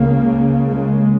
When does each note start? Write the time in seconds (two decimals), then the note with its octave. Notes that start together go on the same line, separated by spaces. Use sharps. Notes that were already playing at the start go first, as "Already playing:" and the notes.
Already playing: C#2 C#3 A#3
0.69 G#3